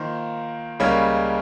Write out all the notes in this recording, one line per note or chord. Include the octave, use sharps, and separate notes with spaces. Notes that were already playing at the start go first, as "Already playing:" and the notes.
Already playing: D#3 A#3 F4 C5
C#2 C#3 G3 A#3 C#4